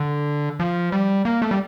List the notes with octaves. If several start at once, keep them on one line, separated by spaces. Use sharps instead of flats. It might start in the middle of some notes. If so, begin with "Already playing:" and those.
Already playing: D3
F3
G3
A#3
A3
G3